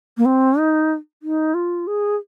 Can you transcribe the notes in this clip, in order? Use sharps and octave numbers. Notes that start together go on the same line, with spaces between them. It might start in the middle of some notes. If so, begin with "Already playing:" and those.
A#3
C4
D#4
D#4
F4
G#4